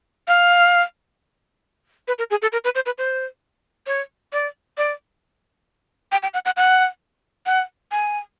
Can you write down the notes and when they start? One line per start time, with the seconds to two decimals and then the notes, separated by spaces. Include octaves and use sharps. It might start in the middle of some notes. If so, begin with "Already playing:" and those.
0.28 F5
2.08 B4
2.18 A#4
2.30 G#4
2.42 A4
2.52 A#4
2.64 B4
2.75 C5
2.86 B4
2.98 C5
3.87 C#5
4.33 D5
4.77 D5
6.12 G5
6.23 G5
6.34 F#5
6.45 F#5
6.57 F#5
7.46 F#5
7.92 G#5